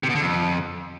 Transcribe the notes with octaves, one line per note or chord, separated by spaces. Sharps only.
C3
B2
D3
F2